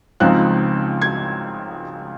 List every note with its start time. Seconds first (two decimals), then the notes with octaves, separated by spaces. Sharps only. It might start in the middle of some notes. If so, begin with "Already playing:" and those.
0.20 C#2 C#3 F3 C4 D#4 F#6
1.02 G#6